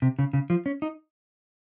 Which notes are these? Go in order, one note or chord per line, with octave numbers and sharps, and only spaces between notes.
C3
C#3
C#3
F3
C#4
D#4